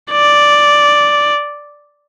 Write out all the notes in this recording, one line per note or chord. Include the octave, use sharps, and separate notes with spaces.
D5